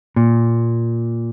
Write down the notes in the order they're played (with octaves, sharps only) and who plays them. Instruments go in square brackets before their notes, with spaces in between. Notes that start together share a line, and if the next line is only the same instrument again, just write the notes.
[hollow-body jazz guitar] A#2